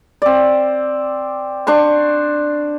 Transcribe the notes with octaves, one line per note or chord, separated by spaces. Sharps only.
C4 D5
D4 C5 C#6